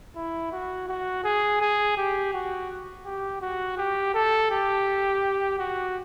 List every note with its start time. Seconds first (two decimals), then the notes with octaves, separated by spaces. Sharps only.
0.16 E4
0.53 F#4
0.89 F#4
1.24 G#4
1.61 G#4
1.97 G4
2.34 F#4
3.06 G4
3.42 F#4
3.78 G4
4.14 A4
4.51 G4
5.59 F#4